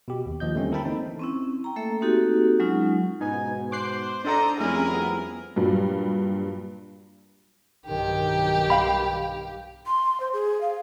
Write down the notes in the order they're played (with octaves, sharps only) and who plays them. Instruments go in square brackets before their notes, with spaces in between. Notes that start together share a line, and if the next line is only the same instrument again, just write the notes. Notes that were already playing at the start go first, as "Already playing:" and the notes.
[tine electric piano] B2 G4
D#2
D#2 F3 D#5 G6
D3 G3 A3 A#3 C4 C#4
E4 A4 A#4 G5 A5 B5
E3 A#3 C4 D#4
[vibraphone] C4 C#4 E4
G5 A#5
A3 A#3 A4 E5
A#3 C4 D#4 F#4 G4 A4
F#3 G#3 C#4 D#4 F4
[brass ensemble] G#2 B2 [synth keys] B3 D#4 [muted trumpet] G#5
[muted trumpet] C5 [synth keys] D6 F#6 C7
[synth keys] D4 A4 D5 [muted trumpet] C5 [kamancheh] D#5 A#5
[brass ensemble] F2 G3 C4 [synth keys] A3 C#4 [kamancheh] E4 G#4 [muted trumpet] A#4
[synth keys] B3
[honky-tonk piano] G2 A#2 F#3 G3
[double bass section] B1 G2 D#3 [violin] G4
[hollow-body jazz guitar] F5 B5
[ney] C6
C5
G#4
F5